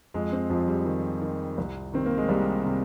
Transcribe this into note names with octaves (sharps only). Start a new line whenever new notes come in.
F2 G#3
C4
F2 F3
G3
D#3
D#3
C2
D#3 C4
A#3
G#3
C2 G3
C3